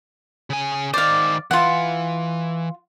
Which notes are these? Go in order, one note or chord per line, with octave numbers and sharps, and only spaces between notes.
C#3 G#5
D#3 C5 D5 F5
E3 F4 F#5